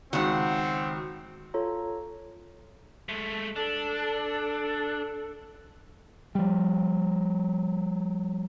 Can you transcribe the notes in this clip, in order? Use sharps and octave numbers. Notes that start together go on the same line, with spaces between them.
C#2 D#3 C4 F#4 F#5
F4 A4 C#5 A#5
G#3 A3
D4 A4
F3 G3